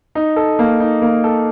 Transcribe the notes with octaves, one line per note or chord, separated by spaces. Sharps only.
D#4
A4
A#3
D#4
A#3
A4